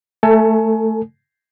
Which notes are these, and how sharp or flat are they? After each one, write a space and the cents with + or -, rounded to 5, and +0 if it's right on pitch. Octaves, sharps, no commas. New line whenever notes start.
A3 +0 A4 +30 G#5 +30